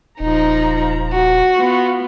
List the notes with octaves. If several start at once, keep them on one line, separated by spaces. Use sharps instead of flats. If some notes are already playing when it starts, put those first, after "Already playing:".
D#1 F3 D#4 A#5
F#4
B3 F4